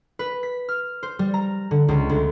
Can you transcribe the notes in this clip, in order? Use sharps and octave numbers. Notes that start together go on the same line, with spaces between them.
B4
B6
F6
C5
G3
A#5
D3
C#2
D2